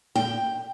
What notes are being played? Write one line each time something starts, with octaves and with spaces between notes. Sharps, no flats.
G5